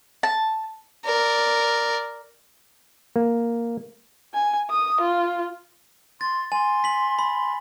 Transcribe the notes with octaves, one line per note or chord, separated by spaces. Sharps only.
A5
A#4 D5
A#3
G#5
D#6
F4
C6 A6
G#5 C6
B6 F#7
B5